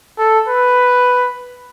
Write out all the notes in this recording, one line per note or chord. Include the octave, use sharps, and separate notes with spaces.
A4
B4